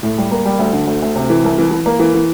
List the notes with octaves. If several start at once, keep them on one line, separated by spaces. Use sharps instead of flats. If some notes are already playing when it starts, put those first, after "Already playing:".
A2
G3
A#3
G3
D2
D3
D2
D2
C3
E3
C2
E3
E3
A#3
E3
E3